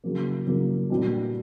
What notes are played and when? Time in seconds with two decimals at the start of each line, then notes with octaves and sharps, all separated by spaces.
0.04 C#3 F#3 A#3
0.47 C#3 F#3 A#3
0.90 A#2 G3 B3 D4 F#4